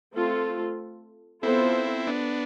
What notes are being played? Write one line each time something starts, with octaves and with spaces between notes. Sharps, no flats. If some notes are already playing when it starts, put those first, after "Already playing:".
A3 C4 F4 A4
B3 C4 E4 F4 A4 C5
B3 D4